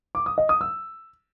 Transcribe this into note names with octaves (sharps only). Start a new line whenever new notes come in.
D6
D#6
D#5
D#6
E6